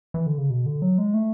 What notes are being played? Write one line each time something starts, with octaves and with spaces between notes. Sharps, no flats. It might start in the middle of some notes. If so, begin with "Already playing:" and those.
E3
D3
C#3
B2
D3
F#3
G#3
A3